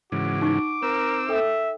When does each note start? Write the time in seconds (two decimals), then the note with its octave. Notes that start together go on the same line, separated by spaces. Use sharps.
0.12 G#2 C#3 E3 F#4 D6
0.42 D#4 F#5 C#6
0.82 C4 A#4 E6
1.29 A4 E5 G5